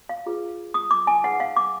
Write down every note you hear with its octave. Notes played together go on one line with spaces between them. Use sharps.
F5
F4 G#4 B4
D#6
D6
G#5
D#4 G#4 B4 F#5
F5
D6